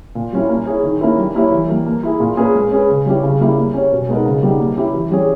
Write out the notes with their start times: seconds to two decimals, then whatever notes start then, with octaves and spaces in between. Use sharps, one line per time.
0.15 A#2
0.33 G3 C#4 E4
0.49 A#3
0.66 E4 G#4 C#5
0.83 D#3
1.01 A#3 C#4 E4 A#4
1.18 G3
1.35 A#3 E4 G4 C#5
1.52 E3
1.69 G3 A#3
1.86 A#3
2.03 E4 G#4
2.20 A#2
2.37 A#3 C#4 G#4 B4
2.54 G#3
2.72 C#4 G#4 B4
2.89 C#3
3.06 G3 C#4 E4 G4
3.23 C#3
3.40 G3 A#3 E4 G4
3.57 A#3
3.74 C#4 G4 C#5
3.92 B2
4.08 G#3 B3 D#4 A#4
4.25 C#3
4.43 G3 B3 D#4 G4
4.60 A#3
4.76 C#4 E4 G4
4.93 E3
5.11 G3 C#4 G#4 C#5